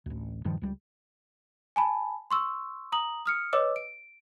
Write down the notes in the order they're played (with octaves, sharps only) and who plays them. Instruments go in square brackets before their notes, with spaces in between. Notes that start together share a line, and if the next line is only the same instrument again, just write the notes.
[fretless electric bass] A1 D2
D#1 G2 D#3 F3
C#2 G3
[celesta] G#5 A5 B5
C6 C#6 E6
A#5 D#6 F#7
D#6 F6 C#7
B4 C#5 D#5 D6 E6
D7